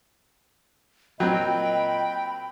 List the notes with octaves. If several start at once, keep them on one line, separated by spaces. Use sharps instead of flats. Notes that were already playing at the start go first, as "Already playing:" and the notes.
A#2 F#3 C4 D#5 G5 B5